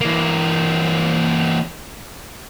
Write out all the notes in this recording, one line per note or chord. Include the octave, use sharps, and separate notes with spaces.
E3 A#3